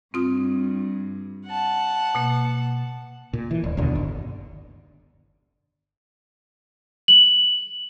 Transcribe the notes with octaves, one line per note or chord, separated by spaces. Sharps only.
G2 C4 F4 D#6
F#5 A5
B2 A#3
A#2
E3
D#1
F1 D#2 B2 D3
G1
F#7